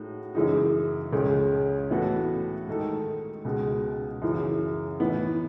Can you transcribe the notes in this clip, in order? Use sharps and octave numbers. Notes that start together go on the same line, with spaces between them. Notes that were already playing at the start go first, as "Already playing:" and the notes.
Already playing: A2 G#3 D#4 F#4
F#2 C#3 E3 G#3 D#4
C#2 C#3 G#3 C#4
A2 E3 B3 F#4 A4
G#2 D#3 A3 D#4 A4
C#2 B2 G#3
F#2 C#3 E3
A2 E3 B3